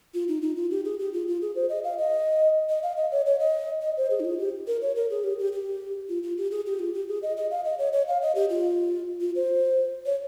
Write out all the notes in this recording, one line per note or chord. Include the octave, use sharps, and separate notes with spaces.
F4
D#4
D#4
F4
G4
G#4
G4
F4
F4
G#4
C5
D#5
F5
D#5
D#5
F5
D#5
C#5
C#5
D#5
D#5
C5
G#4
D#4
F4
G4
A#4
C#5
A#4
G#4
G4
G4
G4
F4
F4
G4
G#4
G4
F4
G4
G#4
D#5
D#5
F5
D#5
C#5
C#5
F5
D#5
G4
F4
F4
C5
C#5